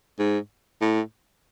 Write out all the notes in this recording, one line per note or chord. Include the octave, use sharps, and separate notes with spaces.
G#2
A2